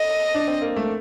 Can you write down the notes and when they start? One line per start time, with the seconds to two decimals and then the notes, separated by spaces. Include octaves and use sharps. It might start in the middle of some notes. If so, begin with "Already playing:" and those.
Already playing: A4 D#5
0.34 D4
0.48 C4
0.62 A#3
0.76 A3